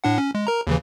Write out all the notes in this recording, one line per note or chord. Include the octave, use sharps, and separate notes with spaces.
A2 D4 F#5
C#4
G#3
A#4 A#5
D#2 C#3 E3